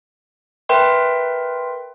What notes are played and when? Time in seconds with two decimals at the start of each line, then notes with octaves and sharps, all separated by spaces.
0.69 A#4 B4 E5 G5 C6